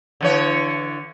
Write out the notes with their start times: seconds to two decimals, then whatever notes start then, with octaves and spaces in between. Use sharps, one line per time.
0.21 D3 E3 C#5